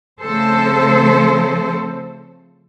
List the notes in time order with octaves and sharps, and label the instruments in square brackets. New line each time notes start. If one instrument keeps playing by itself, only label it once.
[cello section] C#3 F3 A3 C4 A4 C5